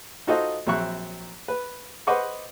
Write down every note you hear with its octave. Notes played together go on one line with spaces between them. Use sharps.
D#4 F4 F#4 A4 C5 D#5
A#1 F#3 C4 E5 C#6 F#6
B4
B4 C5 D#5 F#5 C#6 D6